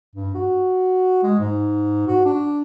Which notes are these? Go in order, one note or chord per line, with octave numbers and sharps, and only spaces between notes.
G2
F#4
G#3
G#2
F#4
D4